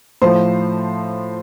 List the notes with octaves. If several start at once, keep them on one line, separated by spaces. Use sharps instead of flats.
A2 F3 C5